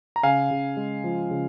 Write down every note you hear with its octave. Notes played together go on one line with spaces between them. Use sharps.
A#5
C#3 F5 G#5
C#3
G#3
F3
C#3